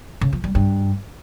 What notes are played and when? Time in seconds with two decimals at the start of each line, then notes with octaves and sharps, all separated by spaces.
0.21 C#3
0.33 F3
0.44 G3
0.55 G2